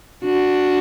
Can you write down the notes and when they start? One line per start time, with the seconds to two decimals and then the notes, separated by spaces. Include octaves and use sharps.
0.24 D4 F#4